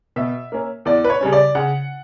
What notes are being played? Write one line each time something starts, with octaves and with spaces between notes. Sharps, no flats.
B2 E5
A#3 C#4
E2 D5
B4
C#5
C#3 G3 C#4
D5
C#3 F#5